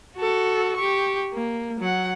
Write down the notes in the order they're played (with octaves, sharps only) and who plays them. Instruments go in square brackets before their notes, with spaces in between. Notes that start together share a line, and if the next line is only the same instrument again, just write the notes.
[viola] F#4 A4
G4 C#6
A#3
F#3 F#5